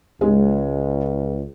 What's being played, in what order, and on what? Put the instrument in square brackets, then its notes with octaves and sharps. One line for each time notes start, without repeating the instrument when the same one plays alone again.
[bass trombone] C#2 [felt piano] G#3